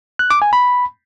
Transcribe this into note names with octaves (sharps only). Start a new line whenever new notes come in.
F#6
D6
G#5
B5